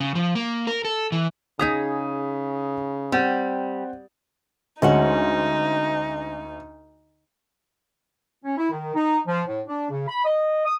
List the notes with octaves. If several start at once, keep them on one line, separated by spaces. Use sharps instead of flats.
C#3
F3
A#3
A#4
A4
E3
C#3 D#4 G#4 A#5 D#6 B6 D#7
G3 C4 F#5
D2 G#3 C#4 D#4 F#4
C#4
E4
D#3
D#4
F3
A2
D4
C#3
B5
D#5
D#6